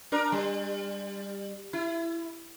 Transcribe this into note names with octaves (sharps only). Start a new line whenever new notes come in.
D4 A#4
G3
E4